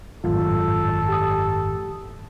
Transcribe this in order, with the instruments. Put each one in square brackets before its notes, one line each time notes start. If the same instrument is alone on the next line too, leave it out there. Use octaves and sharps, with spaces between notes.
[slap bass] G#1 F#2 [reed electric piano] A2 F#3 F4 [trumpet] A4
[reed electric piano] G4 D#6